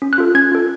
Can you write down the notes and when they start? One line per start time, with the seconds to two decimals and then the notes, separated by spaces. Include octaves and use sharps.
0.02 C#4
0.13 F#6
0.18 F4 A4
0.35 C#4 G#6
0.52 F4 A4